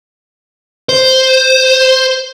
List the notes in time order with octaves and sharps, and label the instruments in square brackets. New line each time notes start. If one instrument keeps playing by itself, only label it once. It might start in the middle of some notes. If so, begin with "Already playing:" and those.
[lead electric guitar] C5